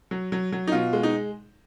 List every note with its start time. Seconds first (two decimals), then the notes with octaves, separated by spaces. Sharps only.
0.11 F#3
0.32 F#3
0.52 F#3
0.67 D#4
0.72 B2 F4
0.93 G#3
1.03 D#4